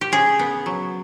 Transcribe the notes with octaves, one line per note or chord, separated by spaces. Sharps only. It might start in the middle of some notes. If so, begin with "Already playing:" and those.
G4
C#3 G#4
B3
F#3